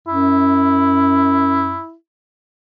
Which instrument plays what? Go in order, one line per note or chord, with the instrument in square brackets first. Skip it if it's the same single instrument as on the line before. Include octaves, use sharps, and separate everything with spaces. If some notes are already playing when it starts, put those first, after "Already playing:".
[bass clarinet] F#2 [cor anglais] E4